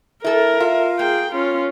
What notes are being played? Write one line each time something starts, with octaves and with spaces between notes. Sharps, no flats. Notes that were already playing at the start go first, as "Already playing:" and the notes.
A3 E4 A4 A#4
F4 E5
A#3 G#4 G5
C#4 F4